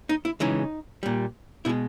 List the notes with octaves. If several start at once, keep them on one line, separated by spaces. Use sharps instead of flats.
D#4
E4
C#3 E3 G#3 D#4
A#2 G3
B2 G#3 E4